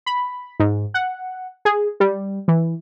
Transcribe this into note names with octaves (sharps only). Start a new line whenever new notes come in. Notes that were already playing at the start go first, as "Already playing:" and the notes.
B5
G#2
F#5
G#4
G3
E3